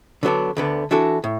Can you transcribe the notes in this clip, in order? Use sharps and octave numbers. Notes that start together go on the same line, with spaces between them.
D3 F#3 B3 D4
D2 D3 B3
E3 D4 F#4 A4
A2